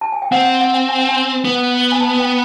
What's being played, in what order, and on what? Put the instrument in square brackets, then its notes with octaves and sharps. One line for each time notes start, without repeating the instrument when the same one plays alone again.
[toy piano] A5
G#5
G5
[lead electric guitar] C4 [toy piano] F#5
[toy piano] F#5
F#5
G5
G#5
G5
G#5
[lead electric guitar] B3
[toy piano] G#5
A5
G5